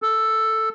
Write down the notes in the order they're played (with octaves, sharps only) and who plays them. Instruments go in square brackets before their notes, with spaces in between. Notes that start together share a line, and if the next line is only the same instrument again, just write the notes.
[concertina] A4